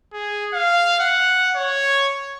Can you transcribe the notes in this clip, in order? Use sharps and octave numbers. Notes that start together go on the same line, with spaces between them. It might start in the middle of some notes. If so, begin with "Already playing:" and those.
G#4
F5
F#5
C#5